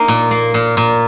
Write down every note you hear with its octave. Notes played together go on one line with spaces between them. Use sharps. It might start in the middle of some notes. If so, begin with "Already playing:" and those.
Already playing: A#3 D#4
A#2
A#3
A#2
A#2